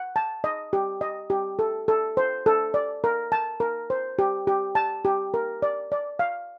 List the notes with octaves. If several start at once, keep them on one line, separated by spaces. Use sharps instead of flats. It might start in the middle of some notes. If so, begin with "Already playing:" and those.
Already playing: F#5
A5
D#5
G4
D#5
G4
A4
A4
C5
A4
D5
A#4
A5
A#4
C5
G4
G4
A5
G4
A#4
D5
D5
F5